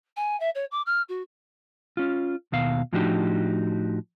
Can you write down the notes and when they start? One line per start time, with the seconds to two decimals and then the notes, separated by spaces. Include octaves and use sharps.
0.17 G#5
0.40 E5
0.55 C#5
0.71 D6
0.86 F6
1.09 F#4
1.97 C#4 F4
2.52 D#2 B2 F5
2.93 A2 F3 D4 D#4 F#4 G4